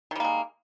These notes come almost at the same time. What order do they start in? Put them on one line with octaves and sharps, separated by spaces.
D#3 G3 A#3 G#3